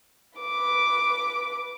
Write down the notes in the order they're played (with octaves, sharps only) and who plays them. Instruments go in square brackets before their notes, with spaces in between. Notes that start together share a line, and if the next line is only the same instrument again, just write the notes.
[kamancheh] B4 D6